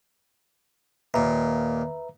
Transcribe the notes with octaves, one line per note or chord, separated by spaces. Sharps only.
D#2 A#2 B4 E5 A#5